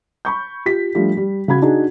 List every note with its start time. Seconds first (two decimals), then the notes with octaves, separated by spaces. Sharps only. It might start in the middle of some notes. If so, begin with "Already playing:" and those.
0.25 B5 C#6 G6
0.66 F4 G4 B6
0.95 F3 G3 A3 D4
1.17 G3
1.48 C#3 F#4 B5 G#6
1.62 D4 D#4 F#4 G#4